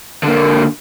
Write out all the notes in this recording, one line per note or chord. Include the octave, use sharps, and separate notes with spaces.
D3 A#3